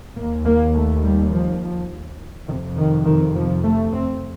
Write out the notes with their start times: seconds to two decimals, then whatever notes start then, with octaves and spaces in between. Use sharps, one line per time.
0.16 D#2 A#3
0.45 A#3
0.74 A3
1.04 G3
1.32 F3
2.48 F2 C3 D#3
2.77 D#3
3.06 D#3
3.35 F3
3.63 A3
3.92 C4